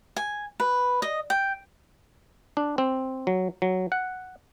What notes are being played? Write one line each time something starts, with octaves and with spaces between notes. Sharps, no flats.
G#5
B4
D#5
G5
D4
C4
F#3
F#3
F#5